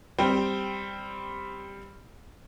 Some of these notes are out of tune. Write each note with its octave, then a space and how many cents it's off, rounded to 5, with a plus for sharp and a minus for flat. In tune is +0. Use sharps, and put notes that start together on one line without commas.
G3 +10 C4 +0 G5 +0